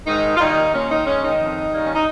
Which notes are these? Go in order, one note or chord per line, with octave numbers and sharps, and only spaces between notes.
G#2 D#3 D#4
F4
D#3 G3 A#3 D#4
A#2 C#4
D#3 D#4
G#3 C#4
D#3 D#4
F2
D#3 G3 A#3
C#4
D#4